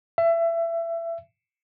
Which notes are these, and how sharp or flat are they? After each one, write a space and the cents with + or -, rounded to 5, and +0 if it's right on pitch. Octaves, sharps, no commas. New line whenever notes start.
E5 +25